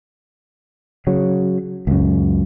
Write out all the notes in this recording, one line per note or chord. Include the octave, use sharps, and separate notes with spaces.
C#3 F#3
C#2 F#2